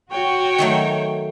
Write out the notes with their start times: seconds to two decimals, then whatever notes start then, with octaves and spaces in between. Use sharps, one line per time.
0.11 F#4 C#5 G5
0.58 D#3 F#3 A3